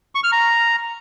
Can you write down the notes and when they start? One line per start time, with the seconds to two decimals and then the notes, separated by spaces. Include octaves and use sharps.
0.15 C#6
0.24 F6
0.32 A#5